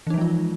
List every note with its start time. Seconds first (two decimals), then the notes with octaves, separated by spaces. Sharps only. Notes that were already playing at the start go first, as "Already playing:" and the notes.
0.07 E3
0.10 D#4
0.14 F3
0.18 G#3
0.21 F4